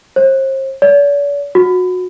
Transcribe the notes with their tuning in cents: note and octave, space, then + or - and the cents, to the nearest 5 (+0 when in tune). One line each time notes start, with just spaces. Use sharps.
C5 +40
D5 -45
F#4 -20